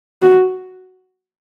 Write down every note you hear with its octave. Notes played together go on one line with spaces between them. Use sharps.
F#4